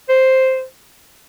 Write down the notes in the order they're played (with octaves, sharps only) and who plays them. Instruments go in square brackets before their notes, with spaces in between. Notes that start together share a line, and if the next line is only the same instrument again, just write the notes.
[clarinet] C5